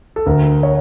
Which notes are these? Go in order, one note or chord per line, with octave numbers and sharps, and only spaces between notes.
A4
D2 A#4
C#5